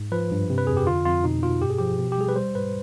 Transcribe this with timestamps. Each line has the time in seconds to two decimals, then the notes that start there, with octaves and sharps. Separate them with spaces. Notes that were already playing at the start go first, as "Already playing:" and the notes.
Already playing: G#2
0.12 F3 B4
0.31 G2
0.50 C3
0.58 B4
0.67 F2 G#4
0.77 G4
0.86 D3 F4
1.05 F2 F4
1.24 B2 D#4
1.43 B2 F4
1.62 G2 G4
1.70 G#4
1.78 F3 G4
1.99 B2
2.12 G4
2.18 G3 G#4
2.29 B4
2.36 G3 C5
2.55 G#2 B4